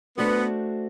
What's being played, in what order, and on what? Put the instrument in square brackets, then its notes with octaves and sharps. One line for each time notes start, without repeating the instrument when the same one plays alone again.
[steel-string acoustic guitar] A3 D4 F#4 C5 [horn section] B3